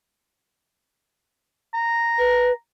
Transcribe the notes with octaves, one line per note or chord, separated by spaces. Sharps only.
A#5
B4